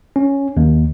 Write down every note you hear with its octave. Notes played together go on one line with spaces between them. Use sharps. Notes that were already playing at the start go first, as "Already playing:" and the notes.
C#4
D#2